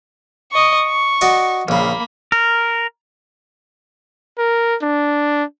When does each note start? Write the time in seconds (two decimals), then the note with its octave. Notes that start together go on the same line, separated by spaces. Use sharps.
0.52 D#5 C#6
0.87 C#6
1.21 F#4 D5 D#5
1.68 A#1 C#3 A#3 B5
2.32 A#4
4.38 A#4
4.82 D4